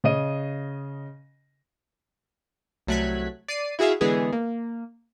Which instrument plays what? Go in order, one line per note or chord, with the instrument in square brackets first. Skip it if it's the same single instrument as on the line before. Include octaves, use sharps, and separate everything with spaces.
[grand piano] C#3 D#5 D#7
[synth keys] C2 F#3 A3 F#6 G#6 B6
D5 C7 D#7
E4 F#4 G#4 E5 F5
D3 E3 G#3 B3 G#4
A#3